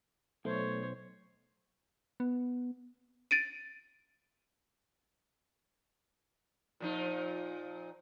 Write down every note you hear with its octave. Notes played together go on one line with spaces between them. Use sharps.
B1 A3 C5 C#5
B3
A6 D7 D#7
A#2 F3 D#4